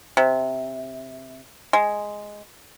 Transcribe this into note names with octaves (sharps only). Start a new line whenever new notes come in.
C3
G#3